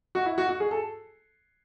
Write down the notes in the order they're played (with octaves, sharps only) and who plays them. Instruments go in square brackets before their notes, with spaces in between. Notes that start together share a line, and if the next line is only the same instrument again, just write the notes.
[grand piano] F#4
E4
F#4
F#4
G#4
A4